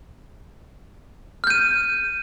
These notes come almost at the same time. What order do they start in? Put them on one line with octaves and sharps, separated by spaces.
F6 G6 D#7